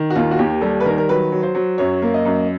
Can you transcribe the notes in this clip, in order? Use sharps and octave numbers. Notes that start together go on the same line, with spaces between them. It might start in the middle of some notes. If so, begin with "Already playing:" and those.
Already playing: D#3
F#4
D#2 F4
F#4
D#2 G4
G3 A4
B4
D#3 A#4
A#4
F#3 B4
F#3
C5
F#3
F#2 C#5
A#3
D#5
F#2